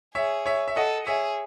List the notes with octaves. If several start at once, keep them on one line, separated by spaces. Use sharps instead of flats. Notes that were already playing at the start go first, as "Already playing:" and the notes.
G#4 C#5 E5
C#5 E5
E5
A4 D#5 F#5
G#4 C#5 E5